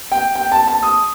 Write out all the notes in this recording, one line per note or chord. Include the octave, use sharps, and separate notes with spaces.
G5
G5
A5
A5
D#6